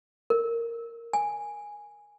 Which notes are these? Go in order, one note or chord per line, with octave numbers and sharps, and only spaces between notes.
A#4
G#5